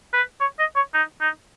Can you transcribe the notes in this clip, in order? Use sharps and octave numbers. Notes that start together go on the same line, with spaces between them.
B4
C#5
D#5
C#5
D#4
D#4